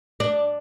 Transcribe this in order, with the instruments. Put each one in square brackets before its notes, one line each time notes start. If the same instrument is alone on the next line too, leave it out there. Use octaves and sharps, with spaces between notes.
[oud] D4